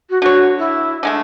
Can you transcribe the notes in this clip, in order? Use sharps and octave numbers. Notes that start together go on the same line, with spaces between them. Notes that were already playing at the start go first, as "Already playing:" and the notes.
F#4
D3 F#4 C#5
E4
D3 G#3 A3